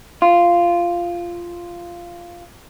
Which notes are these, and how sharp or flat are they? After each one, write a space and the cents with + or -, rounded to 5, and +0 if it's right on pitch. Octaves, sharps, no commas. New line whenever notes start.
F4 -10